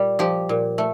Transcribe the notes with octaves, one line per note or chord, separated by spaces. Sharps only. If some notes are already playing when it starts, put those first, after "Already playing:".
Already playing: A#2 G3
F3 G4
A#2
A3